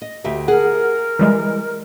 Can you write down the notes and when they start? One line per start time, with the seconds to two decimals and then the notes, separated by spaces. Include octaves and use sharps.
0.02 D#5
0.24 D2 G4 E5
0.48 G#4 A#4 F#5
1.19 E3 G3 G#3